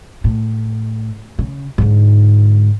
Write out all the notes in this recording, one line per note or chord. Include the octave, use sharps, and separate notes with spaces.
A2
C#3
G#2 D3